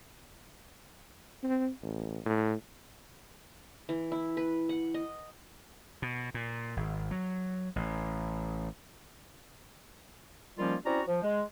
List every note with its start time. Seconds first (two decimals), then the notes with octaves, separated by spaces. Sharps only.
1.43 C4
1.82 A1
2.25 A2
3.89 E3
4.12 E4
4.37 B4
4.69 F#5
4.94 D#5
6.02 B2
6.34 A#2
6.77 G#1
7.11 F#3
7.76 A1
10.58 D#3 F3 G3 A#3 C#4 F4
10.85 C4 C#4 E4 F#4 D5 A#5
11.07 F3
11.23 G#3